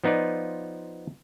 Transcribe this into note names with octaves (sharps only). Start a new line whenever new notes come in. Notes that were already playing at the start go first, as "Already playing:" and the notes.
F3 B3 D#4 F4 D5